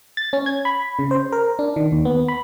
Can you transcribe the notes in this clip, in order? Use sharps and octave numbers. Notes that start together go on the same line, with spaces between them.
A6
C#4
G#6
B5
C#3
C5
A#4
D4
D#3
D#2
B3
B5